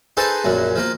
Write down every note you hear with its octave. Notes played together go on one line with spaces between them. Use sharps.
D#4 G#4 A4 B4 C5 A5
A#1 F#2 F#3
F3 A#3